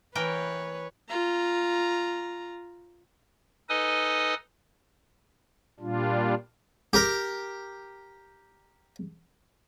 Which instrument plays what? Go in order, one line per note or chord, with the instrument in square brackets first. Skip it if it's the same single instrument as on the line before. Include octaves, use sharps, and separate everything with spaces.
[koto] E3 A#4 G5 [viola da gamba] B4 C#5
[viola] F4 A#5
[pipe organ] D#4 A4 B4 D#5 G#5 D#6
A#2 G3 D4 F4
[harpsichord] G4 A#4